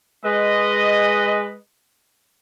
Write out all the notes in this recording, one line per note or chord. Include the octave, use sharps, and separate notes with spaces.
G#3 B4 D#5